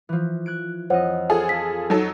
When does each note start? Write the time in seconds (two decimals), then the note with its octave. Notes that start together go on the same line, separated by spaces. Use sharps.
0.09 E3 F3
0.46 F#6 G#6 D7
0.90 F2 C5 C#5 D#5 F#5
1.30 F4 G#4 A4
1.49 B6
1.90 F#3 D#4 A4